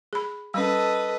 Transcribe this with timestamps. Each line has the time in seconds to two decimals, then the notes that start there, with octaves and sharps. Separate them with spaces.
0.13 G#4 B5
0.54 G3 C#4 A4 B4 D#5